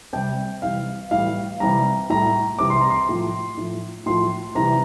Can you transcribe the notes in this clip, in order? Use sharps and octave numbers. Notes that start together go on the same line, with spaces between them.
C3 G3 G5
C3 E3 G3 F5
A2 E3 G3 F5
C3 E3 G3 A#5
A2 G3 A#5
C3 E3 G3 D6
C6
A#5
C6
A2 F3
A2 F3
A2 F3 C6
C3 E3 G3 A#5